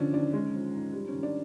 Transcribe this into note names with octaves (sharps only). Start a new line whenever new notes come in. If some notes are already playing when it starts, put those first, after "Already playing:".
Already playing: D3 F3 C#4 D4
D#2 D4
G#3 C#4
F3
G#2
G3
D#3 C#4
D4